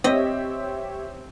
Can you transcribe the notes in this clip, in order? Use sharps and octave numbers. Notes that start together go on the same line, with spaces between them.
C4 G4 C#5 D#5 E5